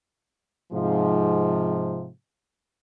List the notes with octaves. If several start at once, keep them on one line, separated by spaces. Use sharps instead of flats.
G#2 C3 F3